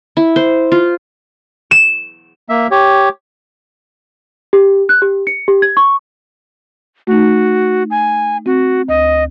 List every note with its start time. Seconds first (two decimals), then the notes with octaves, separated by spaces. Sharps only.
0.17 E4
0.36 C5
0.72 F4
1.71 E7
2.49 A#3 E5
2.71 G4 C#5
4.53 G4
4.89 F#6
5.02 G4
5.27 C#7
5.48 G4
5.62 G#6
5.77 C#6
7.07 A3 D#4 F#4
7.91 G#5
8.46 C4 F#4
8.89 D2 D#5